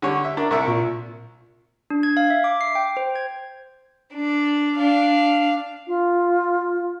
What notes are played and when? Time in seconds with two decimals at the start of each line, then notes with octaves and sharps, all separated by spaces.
0.02 D3 G3 C#5
0.24 E5
0.37 D4 A#4
0.51 C2 A#4 E5 C#6
0.67 A#2
1.90 D4
2.03 G#6
2.17 F5
2.30 E5
2.44 D6
2.61 C7
2.75 G5
2.97 C5
3.16 G#6
4.14 D4
4.78 D4 F5
5.87 F4